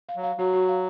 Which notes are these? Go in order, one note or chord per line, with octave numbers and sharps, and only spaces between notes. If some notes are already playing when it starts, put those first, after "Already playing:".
F5
F#3
F5
F#3 F#4
F#4
F5